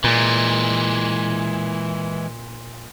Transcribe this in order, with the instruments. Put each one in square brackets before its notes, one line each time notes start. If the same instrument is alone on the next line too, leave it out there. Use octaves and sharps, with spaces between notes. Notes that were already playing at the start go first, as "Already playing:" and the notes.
[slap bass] A#2 [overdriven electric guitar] E3 G#3